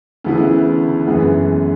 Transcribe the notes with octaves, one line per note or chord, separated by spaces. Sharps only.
D2 C#3 E3 B3 E4
F#2 E3 G#3 B3